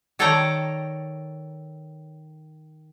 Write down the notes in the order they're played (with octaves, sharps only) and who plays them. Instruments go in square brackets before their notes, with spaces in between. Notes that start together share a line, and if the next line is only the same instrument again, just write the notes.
[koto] D#3 A4 C#5 D5 G5 A#5